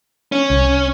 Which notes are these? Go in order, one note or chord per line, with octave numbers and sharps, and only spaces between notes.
C#4
C2